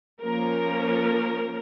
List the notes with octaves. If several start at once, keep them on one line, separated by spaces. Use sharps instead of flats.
F3 A#3 C#4 A#4